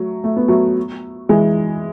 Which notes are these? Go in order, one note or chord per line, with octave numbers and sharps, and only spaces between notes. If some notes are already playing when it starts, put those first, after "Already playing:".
Already playing: F#3 A3
A3
B3
F#3 A3
E3 G#3